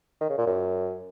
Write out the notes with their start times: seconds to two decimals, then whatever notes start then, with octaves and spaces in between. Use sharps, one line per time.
0.21 D#3
0.29 C#3
0.38 A#2
0.46 F#2